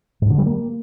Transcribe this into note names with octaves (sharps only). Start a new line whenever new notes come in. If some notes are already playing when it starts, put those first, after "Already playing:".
G#2
D3
G3
A#3